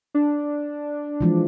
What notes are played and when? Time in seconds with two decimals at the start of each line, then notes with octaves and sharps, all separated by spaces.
0.14 D4
1.21 E3 F3 G#3